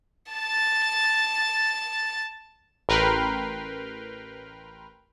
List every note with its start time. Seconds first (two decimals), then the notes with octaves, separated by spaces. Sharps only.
0.32 A5 A6
2.89 A1 A#4 B4 G5 C6 F6